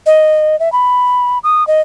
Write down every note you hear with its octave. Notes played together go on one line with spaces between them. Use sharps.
D#5
E5
B5
D#6
D#5